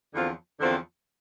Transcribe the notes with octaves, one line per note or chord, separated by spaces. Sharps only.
E2 D3 F3 C4 F4
E2 D3 F3 C4 F4